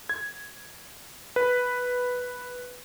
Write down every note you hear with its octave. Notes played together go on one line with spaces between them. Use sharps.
G#6
B4